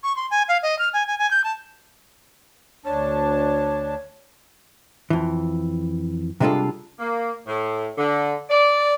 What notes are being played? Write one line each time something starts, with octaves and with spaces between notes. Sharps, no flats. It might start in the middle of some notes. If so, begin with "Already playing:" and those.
C#6
C6
G#5
F5
D#5
F6
G#5
G#5
G#5
G6
A5
D2 D4 C#5 A5
F2 E3
C3 G3 G#3 D4 F4 A4
A#3
A2
D3
D5